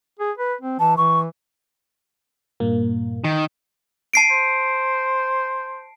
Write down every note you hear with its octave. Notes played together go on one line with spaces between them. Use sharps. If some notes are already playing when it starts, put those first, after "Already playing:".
G#4
B4
C4
E3 A5
E3 C#6
G2 A#2 A#3
D#3
A5 C7 D7
C5